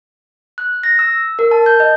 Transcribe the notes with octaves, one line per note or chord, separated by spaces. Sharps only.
F#6
A#6
E6
A#4
A5
G6
D#5